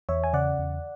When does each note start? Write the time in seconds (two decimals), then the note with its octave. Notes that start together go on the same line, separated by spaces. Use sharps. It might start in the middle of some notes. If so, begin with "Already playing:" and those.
0.09 E2 C#5 E5
0.24 G#5
0.33 C#3 D5 F#5
0.59 E2